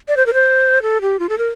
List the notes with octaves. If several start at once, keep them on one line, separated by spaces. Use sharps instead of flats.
D5
C5
A#4
C5
A4
G4
F4
A4
A#4